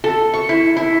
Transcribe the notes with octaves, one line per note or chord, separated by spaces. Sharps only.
A4
C#6
E4
E4